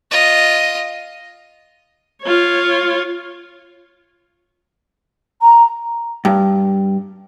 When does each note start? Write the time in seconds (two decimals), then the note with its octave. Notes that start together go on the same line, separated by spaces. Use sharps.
0.11 F4 D#5
2.23 F4 C#5
5.41 A#5
6.25 G2